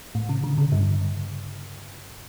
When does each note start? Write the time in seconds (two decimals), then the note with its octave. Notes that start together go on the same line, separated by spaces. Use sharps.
0.15 A2
0.29 C#3
0.44 D3
0.58 C#3
0.72 G2